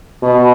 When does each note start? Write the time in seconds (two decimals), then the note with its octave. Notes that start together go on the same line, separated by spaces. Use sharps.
0.23 B2